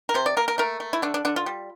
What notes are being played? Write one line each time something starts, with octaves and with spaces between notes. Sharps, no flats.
A#4
C3 C5
D5
A#3 A#4
A#4
A3 A#4
A3
E4
D3 D4
D4
D3 D4
F4
G3